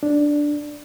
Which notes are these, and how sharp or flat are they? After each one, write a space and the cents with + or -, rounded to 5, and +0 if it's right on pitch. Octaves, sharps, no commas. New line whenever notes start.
D4 +0